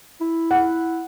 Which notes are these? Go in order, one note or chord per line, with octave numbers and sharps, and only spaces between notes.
E4
F#5